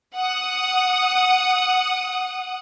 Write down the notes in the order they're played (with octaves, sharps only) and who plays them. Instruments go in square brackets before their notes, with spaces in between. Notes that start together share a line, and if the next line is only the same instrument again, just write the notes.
[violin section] F#5 D#6